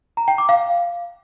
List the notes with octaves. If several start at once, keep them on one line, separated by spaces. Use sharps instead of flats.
A#5
G5
D6
F5